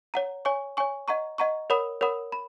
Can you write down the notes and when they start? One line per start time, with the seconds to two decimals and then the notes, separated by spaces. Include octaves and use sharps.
0.14 C#5 F#5 A#5
0.45 C#5 G#5 C#6
0.77 C#5 G#5 C#6
1.08 D#5 F#5 A#5 C#6
1.38 D#5 F#5 A#5 C#6
1.70 A#4 C#5 F#5 B5 D#6
2.01 A#4 C#5 F#5 B5 D#6
2.32 B5